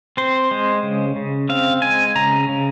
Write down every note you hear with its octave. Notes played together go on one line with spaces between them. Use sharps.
C4 C5
G#3
C#3
C#3
C4 F5
G#3 G#5
C#3 A#5
C#3